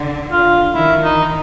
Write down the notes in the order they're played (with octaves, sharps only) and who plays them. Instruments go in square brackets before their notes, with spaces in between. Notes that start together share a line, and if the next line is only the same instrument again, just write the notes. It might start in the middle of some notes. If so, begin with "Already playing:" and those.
Already playing: [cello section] D3
[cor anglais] F4
[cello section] D#3 [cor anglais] E4
[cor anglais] D#4